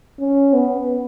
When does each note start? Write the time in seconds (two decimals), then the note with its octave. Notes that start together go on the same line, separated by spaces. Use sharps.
0.20 C#4
0.53 B3